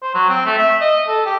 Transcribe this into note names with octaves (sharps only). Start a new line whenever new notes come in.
C5
F#3
C4
A3
E5
D#5
A4
G4